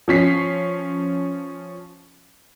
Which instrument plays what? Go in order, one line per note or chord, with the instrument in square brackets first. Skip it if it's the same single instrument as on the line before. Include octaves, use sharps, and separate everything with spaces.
[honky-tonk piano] F3 C#4 B6 C7